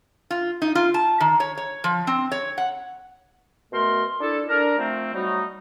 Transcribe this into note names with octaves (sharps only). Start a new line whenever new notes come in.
F4
D#4
F4
A5
D#3
C#5
C#5
F3
C4
C#5
F#5
B2 A3 A#4 C6
D4 E4 A4
D4 A#4
F3 A3 C4
F#3 G3 A3 D#4